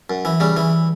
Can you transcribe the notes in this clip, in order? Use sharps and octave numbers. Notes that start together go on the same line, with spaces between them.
F#2
E3
C#3 G3
E3